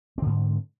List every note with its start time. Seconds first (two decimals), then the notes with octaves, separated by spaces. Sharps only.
0.18 C4
0.22 D3
0.26 G#2